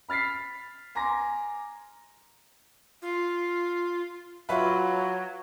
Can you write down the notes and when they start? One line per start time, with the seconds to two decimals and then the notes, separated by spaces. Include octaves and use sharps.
0.09 B5 F6 A6 B6 C7
0.95 G#5 A#5 C6 D6 A#6
3.02 F4
4.49 F#3 F4 B4 E5